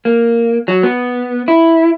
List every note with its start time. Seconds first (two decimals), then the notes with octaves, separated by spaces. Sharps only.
0.05 A#3
0.68 F#3
0.83 B3
1.48 E4